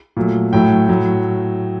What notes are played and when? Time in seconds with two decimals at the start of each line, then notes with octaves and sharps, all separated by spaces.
0.17 A#2 F#3 A3
0.52 A2 F#3 A3 G5
0.88 A2 F#3 A3